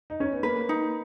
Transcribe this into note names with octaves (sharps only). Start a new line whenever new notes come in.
D#4
C#4
B3
A#3 B4
D#4